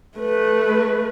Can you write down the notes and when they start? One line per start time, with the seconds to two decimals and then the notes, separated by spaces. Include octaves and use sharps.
0.18 A3 B4